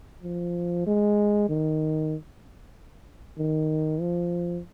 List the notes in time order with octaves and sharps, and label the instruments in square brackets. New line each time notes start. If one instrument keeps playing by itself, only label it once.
[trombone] F3
G#3
D#3
D#3
F3